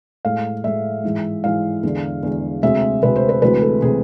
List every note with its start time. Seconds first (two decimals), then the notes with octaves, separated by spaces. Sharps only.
0.25 A2 G#3 F5
0.64 A2 G#3 E5
1.04 G#2 E3 G#3
1.44 G#2 E3 G#3 F5
1.83 E2 D3 G#3
2.23 E2 D3 G#3
2.63 D2 C3 G#3 E5
3.03 D2 C3 G#3 B4
3.16 C5
3.29 B4
3.42 D2 C3 E3 G#3 B4
3.62 A4
3.82 C3 E3 G#3 G#4